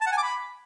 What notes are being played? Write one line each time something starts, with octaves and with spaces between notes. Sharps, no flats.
A5
F#5
G#5
D6
B5